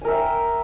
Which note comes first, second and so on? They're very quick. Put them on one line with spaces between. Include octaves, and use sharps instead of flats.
G#5 A#4 E5 G5